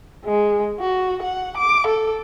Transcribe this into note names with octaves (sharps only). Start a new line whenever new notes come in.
G#3
F#4
F#5
D6
A4